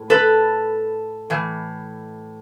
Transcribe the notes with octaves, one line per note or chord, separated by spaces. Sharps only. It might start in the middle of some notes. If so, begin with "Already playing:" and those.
Already playing: A2
A4 B4
A2 E3